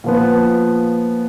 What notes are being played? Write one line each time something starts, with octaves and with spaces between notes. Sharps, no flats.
A#2 F3 B3